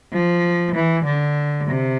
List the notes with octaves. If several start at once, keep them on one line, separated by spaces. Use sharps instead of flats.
F3
E3
D3
C3